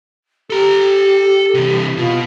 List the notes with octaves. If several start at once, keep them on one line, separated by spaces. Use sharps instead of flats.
G4 A4 A#5
C3 E3
B2 F4